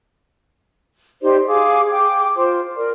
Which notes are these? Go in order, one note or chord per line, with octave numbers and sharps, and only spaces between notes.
D#4 G4 C5 D5
G#4 F5 D6
G5 D6
F4 C5
A#4 D5